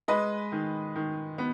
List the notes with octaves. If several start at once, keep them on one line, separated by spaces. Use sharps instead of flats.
G#3 B4 D#5
D#3
D#3
B3